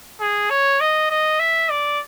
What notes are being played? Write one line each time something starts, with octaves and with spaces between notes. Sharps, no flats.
G#4
C#5
D#5
D#5
E5
D5